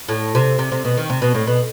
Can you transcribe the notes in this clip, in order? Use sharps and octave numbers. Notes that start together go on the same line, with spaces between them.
A2
C3
C3
C3
B2
D#3
C3
B2
A2
B2